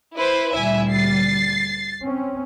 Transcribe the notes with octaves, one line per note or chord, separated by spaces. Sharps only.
E4 B4 C5
D2 A#2 G3 E4 E5 G#5
A6 C7
C4 C#4